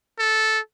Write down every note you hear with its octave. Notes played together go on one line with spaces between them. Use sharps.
A4